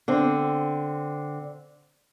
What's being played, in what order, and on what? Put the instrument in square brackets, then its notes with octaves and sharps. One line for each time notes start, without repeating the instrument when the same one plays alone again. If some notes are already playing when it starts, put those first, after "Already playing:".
[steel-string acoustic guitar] D3 C4